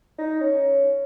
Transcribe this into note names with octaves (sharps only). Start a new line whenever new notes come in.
D#4
C#4